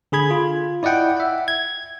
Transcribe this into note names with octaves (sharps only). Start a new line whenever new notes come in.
D3 G#4 B5 G#6
F4
E4 D5 D#5 F#5 G5
E5 F#5
G#6